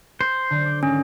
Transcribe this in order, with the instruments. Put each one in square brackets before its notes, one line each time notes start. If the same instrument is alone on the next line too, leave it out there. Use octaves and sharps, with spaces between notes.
[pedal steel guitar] C5
[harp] D3 F#3
D6
[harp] G#1 [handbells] C#4